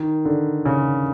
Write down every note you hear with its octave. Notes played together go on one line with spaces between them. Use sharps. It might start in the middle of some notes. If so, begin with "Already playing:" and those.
Already playing: D#3
D3
C#3